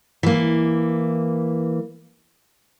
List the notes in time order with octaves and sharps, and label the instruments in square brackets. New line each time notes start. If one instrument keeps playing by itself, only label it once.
[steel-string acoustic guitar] E3 A#3